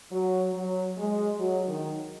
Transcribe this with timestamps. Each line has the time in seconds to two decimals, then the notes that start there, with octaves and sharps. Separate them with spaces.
0.11 F#3
0.53 F#3
0.97 G#3
1.39 F#3
1.67 D#3